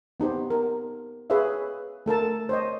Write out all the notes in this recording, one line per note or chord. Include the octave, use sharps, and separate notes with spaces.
B3 D#4 G4 C5
A#4
G#4 B4 C#5 E5 F5
A3 A4 A#4 A5
C5 C#5 D#5